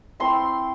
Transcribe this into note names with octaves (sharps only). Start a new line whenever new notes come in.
A3 C4 E4 C6